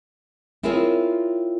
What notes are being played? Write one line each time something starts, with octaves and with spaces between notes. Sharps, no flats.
C4 E4 F4 G#4 A#4 C#5